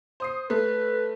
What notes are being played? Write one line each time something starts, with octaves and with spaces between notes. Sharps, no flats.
C5 D#6 C7
A3 B4